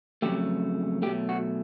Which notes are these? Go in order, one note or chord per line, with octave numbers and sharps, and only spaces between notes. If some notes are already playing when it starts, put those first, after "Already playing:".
F2 C#3 F#3 A3 G4
B2 F#3 A3 G4
F#4